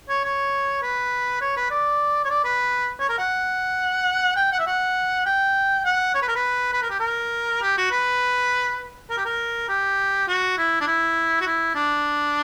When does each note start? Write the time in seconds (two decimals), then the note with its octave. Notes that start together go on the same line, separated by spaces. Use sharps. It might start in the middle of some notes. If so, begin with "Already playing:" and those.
0.09 C#5
0.24 C#5
0.83 B4
1.42 C#5
1.57 B4
1.71 D5
2.25 C#5
2.30 D5
2.45 B4
3.00 C#5
3.09 A#4
3.19 F#5
4.37 G5
4.52 F#5
4.59 E5
4.67 F#5
5.26 G5
5.85 F#5
6.15 C#5
6.22 B4
6.28 A#4
6.36 B4
6.73 B4
6.83 A#4
6.90 G4
7.00 A#4
7.62 G4
7.77 F#4
7.92 B4
9.10 A#4
9.18 G4
9.25 A#4
9.69 G4
10.28 F#4
10.58 E4
10.81 D4
10.87 E4
11.41 F#4
11.47 E4
11.75 D4